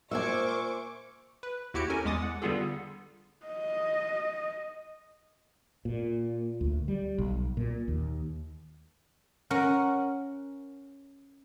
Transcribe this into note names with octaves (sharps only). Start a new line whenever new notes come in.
A#2 A#4 C5 E5 F5 G#5 C#6 D6
B4
D#2 E4 F#4 G4 C#7 D7
C#4 A4 A#4 G#5
E2 G#3 D6 D#6 A6
F#5
D3 G3 B3 F4 G#4 A4
D#5
A#2
D2
G3
B1
A#2
D#2
C#4 A#4 F#5